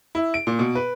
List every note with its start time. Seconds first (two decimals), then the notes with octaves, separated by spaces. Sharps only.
0.15 E4
0.34 D7
0.47 A#2
0.59 B2
0.75 B4